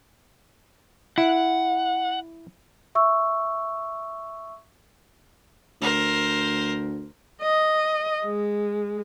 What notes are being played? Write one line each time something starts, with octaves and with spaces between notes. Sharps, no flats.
E4 F#5
E5 C#6 E6
D2 A#4 C5
D#5
G#3